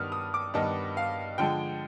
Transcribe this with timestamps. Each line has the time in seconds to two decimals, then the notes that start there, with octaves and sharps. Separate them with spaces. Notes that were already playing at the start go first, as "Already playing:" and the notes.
Already playing: G2 D#3 B3 D4 D#6 F6
0.12 D#6
0.34 D6
0.54 G2 D#3 B3 D4 D#5
0.97 F5
1.38 D3 F3 G#3 G5